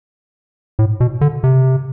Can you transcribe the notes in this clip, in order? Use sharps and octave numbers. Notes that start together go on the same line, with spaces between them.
A2
B2
D3
C3